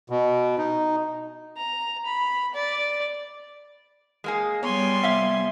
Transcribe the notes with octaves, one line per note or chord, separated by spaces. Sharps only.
B2
D#4
A#5
B5
D5
G#3 A#3 G#4
G3 B3 C#5 G#5 C6
C3 E5 F5